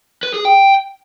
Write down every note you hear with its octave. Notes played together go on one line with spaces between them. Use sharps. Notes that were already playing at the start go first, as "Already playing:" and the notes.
B4
G#4
G5